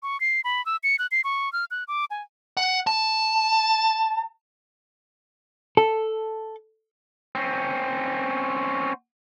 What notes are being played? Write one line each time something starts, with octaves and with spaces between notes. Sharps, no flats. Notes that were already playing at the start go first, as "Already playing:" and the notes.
C#6
C7
B5
E6
C#7
F#6
C7
C#6
F6
F#6
D6
G#5
F#5
A5
A4
C4 C#4